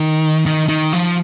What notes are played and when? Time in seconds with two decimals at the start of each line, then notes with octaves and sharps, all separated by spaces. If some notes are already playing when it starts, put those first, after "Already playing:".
Already playing: D#3
0.46 D#3
0.69 D#3
0.93 F3